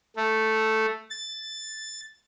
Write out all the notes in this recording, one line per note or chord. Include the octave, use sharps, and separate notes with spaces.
A3
A6